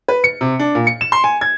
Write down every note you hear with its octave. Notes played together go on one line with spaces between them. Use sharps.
B4
C#7
C3
D4
A#2
C#7
E7
C6
G#5
G#6